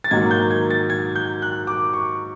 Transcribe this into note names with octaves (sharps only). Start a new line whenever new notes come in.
A6
G#2 D#3 F#3 A#3 G#6
G6
G#6
A6
G#6
G6
F#6
D6
C#6